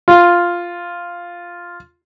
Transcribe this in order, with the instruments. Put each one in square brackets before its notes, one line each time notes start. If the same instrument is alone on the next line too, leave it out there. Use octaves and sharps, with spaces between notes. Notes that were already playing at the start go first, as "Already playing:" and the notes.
[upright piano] F4